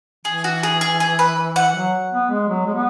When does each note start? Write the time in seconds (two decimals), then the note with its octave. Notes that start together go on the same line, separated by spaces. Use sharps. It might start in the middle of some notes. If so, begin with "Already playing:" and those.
0.25 E3 G#4
0.44 F#4
0.63 G#4
0.81 G#4
1.00 G#4
1.19 B4
1.56 F#5
1.75 F#3
2.12 B3
2.31 G#3
2.49 F#3
2.67 G#3
2.74 B3